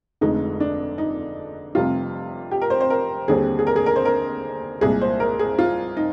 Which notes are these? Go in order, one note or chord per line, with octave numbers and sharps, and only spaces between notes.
F1 F2 D3 G#3 D#4
D4
D#4
F1 F2 C3 G3 F4
G4
A#4
C5
C5
A#4
D#2 D3 G3 C4 G#4
G#4
A#4
G#4
A#4
C5
A#4
C2 A#2 G#3 G#4
C5
A#4
G#4
F4
D#4